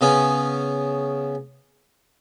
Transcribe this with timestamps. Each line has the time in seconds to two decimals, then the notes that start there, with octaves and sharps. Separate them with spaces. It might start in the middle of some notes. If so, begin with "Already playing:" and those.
0.01 C#3 B3 C#4